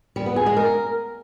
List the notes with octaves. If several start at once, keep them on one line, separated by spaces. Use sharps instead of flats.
G3
B3
G#4
G#3
A#4